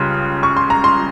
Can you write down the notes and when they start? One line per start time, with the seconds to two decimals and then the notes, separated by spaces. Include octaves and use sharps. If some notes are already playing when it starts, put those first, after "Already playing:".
Already playing: C#2 C#3 G3 C6
0.43 C#6
0.57 C6
0.70 A#5
0.84 C6